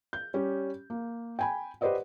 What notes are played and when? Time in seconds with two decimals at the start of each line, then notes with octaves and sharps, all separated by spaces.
0.13 G6
0.34 G3 C#4 G4
0.90 A#3
1.39 G5 G#5 B5
1.81 G4 B4 C5 D5 D#5 F#5